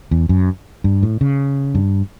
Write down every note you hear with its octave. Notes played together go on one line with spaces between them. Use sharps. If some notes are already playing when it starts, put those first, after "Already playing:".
E2
F#2
G2
A2
C#3
G2